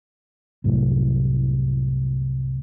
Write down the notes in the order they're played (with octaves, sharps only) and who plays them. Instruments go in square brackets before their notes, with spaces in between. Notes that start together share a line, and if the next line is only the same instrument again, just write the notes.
[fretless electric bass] C2 F#2 A2